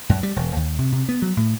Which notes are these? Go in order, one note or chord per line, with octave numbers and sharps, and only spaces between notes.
F#2
G3
E1
D#2
C3
C3
B3
F#3
A2